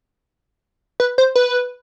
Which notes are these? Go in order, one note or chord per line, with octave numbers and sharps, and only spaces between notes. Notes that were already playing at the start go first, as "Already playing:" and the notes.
B4
C5
B4